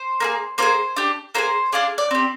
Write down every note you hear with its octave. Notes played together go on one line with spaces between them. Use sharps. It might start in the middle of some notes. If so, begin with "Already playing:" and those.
Already playing: C5
A#3 F4 G#4
A#3 F4 G#4 C5
D4 G4
A#3 F4 G#4 C5
D4 F4 G#4 D5
D5
C4 G4